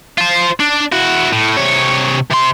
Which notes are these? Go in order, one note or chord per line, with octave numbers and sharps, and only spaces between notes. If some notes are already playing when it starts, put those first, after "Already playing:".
F4 C5
D4
E4 F#4
A2
C3 C#5
C3 C6